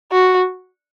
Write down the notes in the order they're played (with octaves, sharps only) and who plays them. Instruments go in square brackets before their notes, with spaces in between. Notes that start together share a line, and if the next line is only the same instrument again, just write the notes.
[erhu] F#4